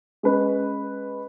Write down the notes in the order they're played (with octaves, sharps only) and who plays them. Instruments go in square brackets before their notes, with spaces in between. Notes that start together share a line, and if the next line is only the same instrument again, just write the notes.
[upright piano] G#3 C#4 B4